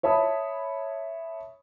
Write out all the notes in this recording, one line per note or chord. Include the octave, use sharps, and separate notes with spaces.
C#5 E5 A5 B5 D#6